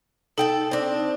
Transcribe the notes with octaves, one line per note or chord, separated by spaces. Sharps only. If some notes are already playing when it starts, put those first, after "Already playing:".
D#4 A4 G5 A5
C4 D4